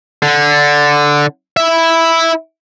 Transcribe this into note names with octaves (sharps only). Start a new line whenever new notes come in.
D3
E4 E5